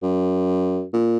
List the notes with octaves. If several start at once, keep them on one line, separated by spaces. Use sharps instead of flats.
F#2
A#2